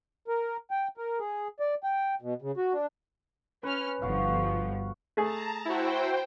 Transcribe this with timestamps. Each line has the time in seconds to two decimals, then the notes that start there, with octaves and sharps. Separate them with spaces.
0.28 A#4
0.71 G5
0.97 A#4
1.20 G#4
1.60 D5
1.83 G5
2.22 B2
2.42 C#3
2.57 F#4
2.73 D4
3.63 C#4 B4 F6
4.02 G1 F3 F#4 F5
5.17 A3 G#4 A5 A#5
5.65 E4 F#4 C5 G5